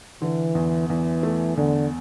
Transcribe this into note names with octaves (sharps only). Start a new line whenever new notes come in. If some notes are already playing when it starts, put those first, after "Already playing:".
D3 E3
E2
E2 E3
A3
E2 D3